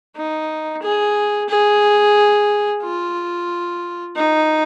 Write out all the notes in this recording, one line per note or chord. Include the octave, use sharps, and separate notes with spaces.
D#4
G#4
G#4
F4
D#4